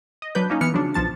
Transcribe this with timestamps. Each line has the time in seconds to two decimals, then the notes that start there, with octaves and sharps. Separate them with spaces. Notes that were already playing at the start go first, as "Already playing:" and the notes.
0.22 D#5
0.35 F#3 D4 B4 G6
0.50 A#3 C#4 D#4
0.61 E3 B3 F6 C#7
0.74 C#3 F3 F#3 D4
0.94 B1 F3 A5 A6